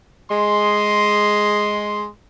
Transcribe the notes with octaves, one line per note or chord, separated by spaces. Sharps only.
G#3 C6